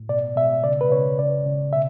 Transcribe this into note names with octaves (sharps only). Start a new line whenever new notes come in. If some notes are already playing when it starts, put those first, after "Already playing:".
Already playing: A2
B2 D5
B2 E5
C#3 D5
B4
C#3 C#5
C#3 D5
C#3
B2 E5